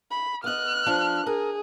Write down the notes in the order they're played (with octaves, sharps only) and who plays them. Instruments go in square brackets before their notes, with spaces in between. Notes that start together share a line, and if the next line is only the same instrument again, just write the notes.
[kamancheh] B5
[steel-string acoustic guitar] B3 D#5 [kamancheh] F6 F#6
[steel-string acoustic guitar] F3 D4
[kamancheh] G#4 [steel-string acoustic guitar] A#4